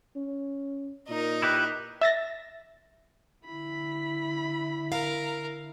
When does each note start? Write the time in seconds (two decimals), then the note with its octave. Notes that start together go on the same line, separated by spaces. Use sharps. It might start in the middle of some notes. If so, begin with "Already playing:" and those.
0.16 C#4
1.09 A#2 D#4 A#4
1.42 E4 G4 B4
2.01 E5 A6 A#6
3.45 D3 E4 B5
4.92 A#4 F5